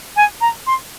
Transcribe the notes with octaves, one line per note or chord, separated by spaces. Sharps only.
G#5
A#5
C6